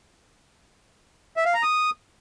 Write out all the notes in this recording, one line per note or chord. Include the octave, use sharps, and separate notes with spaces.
E5
F5
A#5
D#6